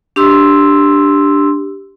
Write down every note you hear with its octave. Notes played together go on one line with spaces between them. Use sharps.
D4 G4 C6 E6